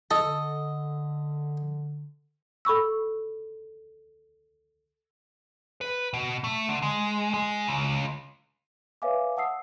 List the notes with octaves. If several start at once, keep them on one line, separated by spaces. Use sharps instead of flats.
D3 A4 D#5
A4 B5 C#6 E6
B4
B2
A3
D3
G#3
G#3
C#2
B4 C#5 E5 F5 G#5 D6
F#5 A5 D#6 E6 C7